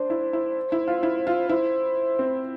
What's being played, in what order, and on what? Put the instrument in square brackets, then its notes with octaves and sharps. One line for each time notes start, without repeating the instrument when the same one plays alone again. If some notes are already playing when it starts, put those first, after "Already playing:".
Already playing: [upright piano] D4 [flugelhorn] C5
[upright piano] E4
E4
E4
F4
E4
F4
[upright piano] E4 [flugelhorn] C5
[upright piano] C4